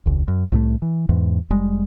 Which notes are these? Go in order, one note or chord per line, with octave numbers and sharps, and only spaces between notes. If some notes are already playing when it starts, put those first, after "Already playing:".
E1 C#2
F#2
C2 A2 F3 A3
E3
E2 G#2 E3
F1 G3 G#3